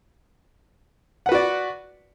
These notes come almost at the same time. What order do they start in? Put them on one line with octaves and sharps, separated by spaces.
F#5 B4 F#4 D5